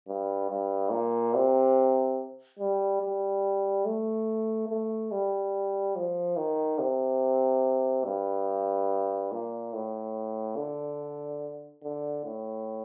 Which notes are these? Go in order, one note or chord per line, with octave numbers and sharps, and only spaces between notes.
G2
G2
A#2
C3
G3
G3
A3
A3
G3
F3
D#3
C3
G2
A#2
A2
D3
D3
A2